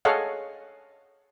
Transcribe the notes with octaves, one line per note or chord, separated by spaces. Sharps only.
G#4 A4 C#5 D#5 F5 F#5